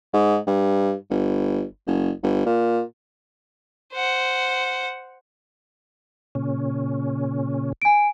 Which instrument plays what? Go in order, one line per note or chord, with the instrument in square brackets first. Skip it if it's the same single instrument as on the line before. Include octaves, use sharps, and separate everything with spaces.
[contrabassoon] G#2
G2
G1
F#1
G1
A#2
[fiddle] C5 F#5
[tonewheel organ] A#2 C#3 C#4
[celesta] G#5 D7